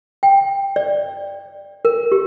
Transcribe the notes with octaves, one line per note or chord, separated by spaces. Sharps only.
G5
D5
A#4
G4